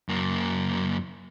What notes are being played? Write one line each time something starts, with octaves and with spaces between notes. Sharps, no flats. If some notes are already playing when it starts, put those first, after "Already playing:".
F#2 A#3